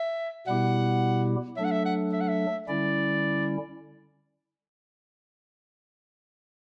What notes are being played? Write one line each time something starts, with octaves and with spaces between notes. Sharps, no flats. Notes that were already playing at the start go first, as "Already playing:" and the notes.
Already playing: E5
B2 G3 B3 E4 G4 F#5
F#3 A3 D4 A4 E5
F#5
E5
F#5
E5
F#5
E5
D3 G3 C#4 E4 D5